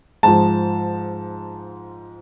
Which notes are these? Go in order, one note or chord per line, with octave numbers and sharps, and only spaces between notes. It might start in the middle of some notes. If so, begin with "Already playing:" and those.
G#2 F3 A5